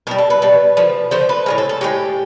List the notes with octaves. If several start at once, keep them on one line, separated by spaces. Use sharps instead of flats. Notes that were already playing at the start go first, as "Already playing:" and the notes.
B2 G3 A#4
A4
B4
B2 G3
D3 F3 A3
D3 F3 A3 C5
B4
A2 E3 G#3 A#4
A4
A4
A2 E3 G#3 G4